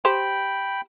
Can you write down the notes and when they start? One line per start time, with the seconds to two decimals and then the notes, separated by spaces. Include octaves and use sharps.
0.05 G4 C5 G5 B5